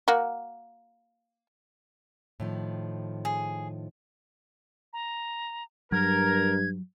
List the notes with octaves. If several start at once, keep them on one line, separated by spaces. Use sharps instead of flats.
A#3 F#4
A2 D#3 F3
G#4
A#5
G2 F#3 A#4 G#6